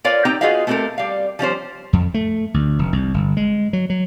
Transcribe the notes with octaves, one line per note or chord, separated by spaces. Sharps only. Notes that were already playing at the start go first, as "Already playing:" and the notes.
F4 A#4 B4 C#5 D5 F5
C4 D#4 G4 G5 A#5
F4 F#4 G#4 B4 D#5 F5
A3 B3 C4 G4 A4 A#4
G3 F5
F3 G3 C#4 C5
F2
A3
D2
F1
C2
G1
G#3
F#3
F#3